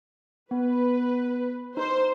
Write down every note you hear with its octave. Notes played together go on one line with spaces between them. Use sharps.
B3 B4
D#4 C5